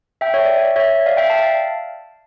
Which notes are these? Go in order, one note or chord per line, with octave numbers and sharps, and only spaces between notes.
E5 G5
C#5 E5
D5
D5
C#5 E5
D5 F5
E5 G5
F5 A5